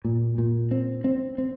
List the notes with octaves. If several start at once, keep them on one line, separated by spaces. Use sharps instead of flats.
A#2
A#2
C4
C4
C4